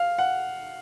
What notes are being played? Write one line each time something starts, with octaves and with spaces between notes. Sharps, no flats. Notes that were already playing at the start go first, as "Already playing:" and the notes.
Already playing: F5
F#5